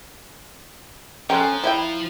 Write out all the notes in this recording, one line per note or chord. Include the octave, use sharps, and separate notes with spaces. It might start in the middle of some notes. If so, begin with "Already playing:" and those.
F3 C#4 A4 C#5 G5 A#5 C6 F#6
C4 E4 E5 G5